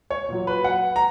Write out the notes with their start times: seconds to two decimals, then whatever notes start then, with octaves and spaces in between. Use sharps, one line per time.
0.10 C#5
0.29 A#2 F#3
0.47 B4
0.64 F#5
0.96 A#5